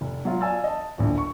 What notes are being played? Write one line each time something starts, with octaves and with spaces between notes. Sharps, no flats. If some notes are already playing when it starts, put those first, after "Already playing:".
F1
F#3 F4
D5 F5 G#5 E6 A6
D#5 A5
D1 A#1
C#6